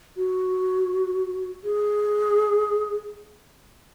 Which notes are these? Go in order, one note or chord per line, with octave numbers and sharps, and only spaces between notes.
F#4
G#4